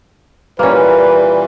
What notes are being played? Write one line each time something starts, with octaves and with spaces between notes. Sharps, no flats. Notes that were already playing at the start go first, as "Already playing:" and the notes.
A#2 E3 G3 A#3 C#4 B4